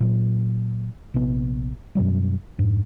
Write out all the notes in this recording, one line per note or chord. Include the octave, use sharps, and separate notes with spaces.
A#2 F#3
A#1 C3 B3
F#2 B2 F#3 G3
F2 G#2